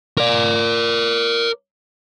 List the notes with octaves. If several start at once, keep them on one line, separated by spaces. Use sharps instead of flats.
A#4 D5